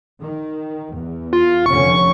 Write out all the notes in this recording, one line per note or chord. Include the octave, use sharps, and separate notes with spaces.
D#3
E2
F4
F1 D3 C#4 C#6